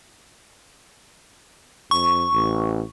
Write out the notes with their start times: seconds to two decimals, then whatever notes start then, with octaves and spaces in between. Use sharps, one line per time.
1.91 F2 C#6
2.32 A1